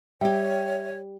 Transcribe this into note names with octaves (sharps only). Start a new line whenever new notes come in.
G3 G4 C#5 E5 G5